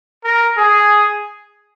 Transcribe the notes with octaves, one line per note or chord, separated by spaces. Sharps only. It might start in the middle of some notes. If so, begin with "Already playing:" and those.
A#4
G#4